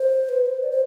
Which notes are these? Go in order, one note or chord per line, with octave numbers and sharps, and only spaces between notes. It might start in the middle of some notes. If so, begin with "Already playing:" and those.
Already playing: C5
B4
C5
D5
C5